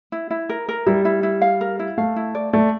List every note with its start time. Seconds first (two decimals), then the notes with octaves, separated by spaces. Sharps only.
0.12 E4
0.31 E4
0.49 A#4
0.69 A#4
0.87 G3 E4
1.05 E4
1.23 E4
1.42 F5
1.61 A#4
1.79 E4
1.98 A3 F5
2.16 E4
2.35 D5
2.53 A3 D5